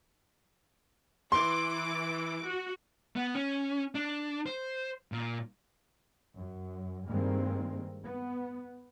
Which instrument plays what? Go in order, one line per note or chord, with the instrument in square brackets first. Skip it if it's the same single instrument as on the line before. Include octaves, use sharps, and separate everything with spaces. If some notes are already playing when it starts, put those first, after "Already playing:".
[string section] E3 D6 [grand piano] C6
[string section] F#4
[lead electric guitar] B3
C#4
D4
C5
A#2
[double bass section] F#2
G2 D#3 G#3 A#3 C4
B3